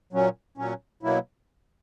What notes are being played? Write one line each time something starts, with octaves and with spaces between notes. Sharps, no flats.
A#2 F#3 C#4
A#2 F#3 C#4
B2 F#3 A#3 E4